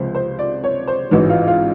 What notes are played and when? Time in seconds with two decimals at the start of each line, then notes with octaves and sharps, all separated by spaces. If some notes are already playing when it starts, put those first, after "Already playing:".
Already playing: C#2 C3 F3 G#3 C5
0.15 C5
0.39 D5
0.64 C#5
0.88 C5
1.11 A1 G#2 E3 F#4
1.30 F4
1.47 F4